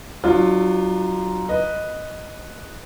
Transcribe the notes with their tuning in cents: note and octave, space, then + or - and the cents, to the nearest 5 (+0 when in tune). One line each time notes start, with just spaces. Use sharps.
F#3 +10 D4 +45 F4 +0
B4 -5 D#5 +0